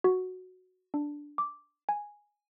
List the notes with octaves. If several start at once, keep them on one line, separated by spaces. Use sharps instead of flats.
F#4
D4
D6
G#5